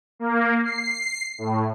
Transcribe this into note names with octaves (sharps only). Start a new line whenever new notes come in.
A#3
C7
A2